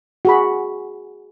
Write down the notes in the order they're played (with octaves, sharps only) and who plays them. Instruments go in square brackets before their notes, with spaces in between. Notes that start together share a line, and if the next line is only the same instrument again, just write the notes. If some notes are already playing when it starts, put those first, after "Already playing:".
[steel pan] F#4 G#4 B5